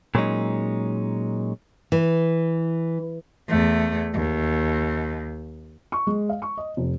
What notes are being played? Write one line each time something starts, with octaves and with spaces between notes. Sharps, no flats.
A#2 F#3 G#3 C#4 D#4
E3
E2 A3
D#2
C#6
G#3
F5
C#6
D#5
F1